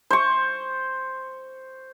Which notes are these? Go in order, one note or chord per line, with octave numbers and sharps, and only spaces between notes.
C5 C#6